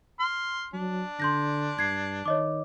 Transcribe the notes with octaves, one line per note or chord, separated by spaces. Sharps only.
C6 F6
F#3 D4
D3 C6 G6 A#6
G2 G#6 C7
D#3 C#5 D#5 D6